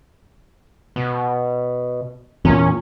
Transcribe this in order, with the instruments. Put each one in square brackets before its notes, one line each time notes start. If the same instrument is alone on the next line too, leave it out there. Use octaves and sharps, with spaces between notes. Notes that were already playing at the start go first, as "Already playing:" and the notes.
[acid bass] B2
[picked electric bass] E2 A#2 [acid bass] C#4